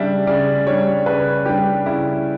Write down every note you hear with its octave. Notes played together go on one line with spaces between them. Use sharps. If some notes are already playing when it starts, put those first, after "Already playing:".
Already playing: C#3 G3 D4 E5
C#3 D5
G3 D4 C#5
C#3 B4
G3 D4 G4
C#3 E4